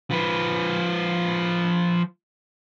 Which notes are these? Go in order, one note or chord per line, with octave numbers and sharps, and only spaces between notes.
F3 B4